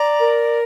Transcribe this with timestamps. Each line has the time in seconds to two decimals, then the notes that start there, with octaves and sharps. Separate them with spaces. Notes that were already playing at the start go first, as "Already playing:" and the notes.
Already playing: D5 A#5
0.19 A#4